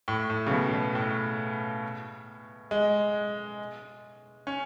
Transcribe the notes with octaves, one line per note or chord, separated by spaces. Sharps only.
A2
A2
C#3
B2
B2
A2
G#3
C#4